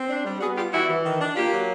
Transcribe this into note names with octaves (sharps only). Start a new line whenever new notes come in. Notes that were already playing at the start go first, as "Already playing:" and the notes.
Already playing: C4
D4
G3
B3 F#4 G#4
G3 F4 G4
E3 E4 F#4
E3
D#3
D4
A#3 F4 G4
F#3